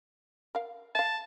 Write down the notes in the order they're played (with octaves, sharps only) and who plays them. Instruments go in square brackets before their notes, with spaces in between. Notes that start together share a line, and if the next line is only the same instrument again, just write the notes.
[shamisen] A#4 F5
[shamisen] E5 F5 [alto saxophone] A5